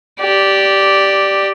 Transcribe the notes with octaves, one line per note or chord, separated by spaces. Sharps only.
G4 D5